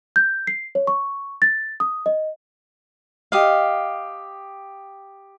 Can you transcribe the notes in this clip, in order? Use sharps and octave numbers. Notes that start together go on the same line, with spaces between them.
G6
C7
C#5
C#6
A6
D#6
D#5
G4 D#5 F5